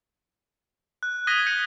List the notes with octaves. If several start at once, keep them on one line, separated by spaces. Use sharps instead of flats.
F#6
D#6 G#6 A#6 B6 D#7 G7
G6 C#7 D#7